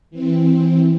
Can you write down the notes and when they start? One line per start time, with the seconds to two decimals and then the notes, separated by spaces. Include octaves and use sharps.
0.10 E3 C4